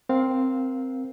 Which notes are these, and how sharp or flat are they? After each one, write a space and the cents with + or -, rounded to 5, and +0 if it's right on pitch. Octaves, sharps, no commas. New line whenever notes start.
C4 +0 A#4 +0 F5 +15